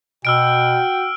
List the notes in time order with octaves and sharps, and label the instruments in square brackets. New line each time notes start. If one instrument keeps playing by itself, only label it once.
[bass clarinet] B2 [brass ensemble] F#4 G5 [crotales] E6 F6 D7